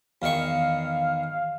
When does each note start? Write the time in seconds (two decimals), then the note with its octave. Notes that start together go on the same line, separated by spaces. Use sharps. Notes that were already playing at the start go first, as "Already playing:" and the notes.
0.22 E2 D#3 F5 C#6